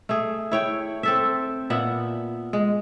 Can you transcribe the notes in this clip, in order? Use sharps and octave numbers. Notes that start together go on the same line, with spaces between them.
A3 G#4
E4 C#5 G5
C4 A4 E5
A#2 B3 E5 F#5
G#3